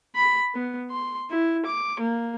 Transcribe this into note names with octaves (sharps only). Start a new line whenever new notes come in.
B5
B3
C6
E4
D6
A#3